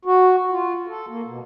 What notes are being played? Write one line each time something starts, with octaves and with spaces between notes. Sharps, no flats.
F#4
F4
A4
A#3
B2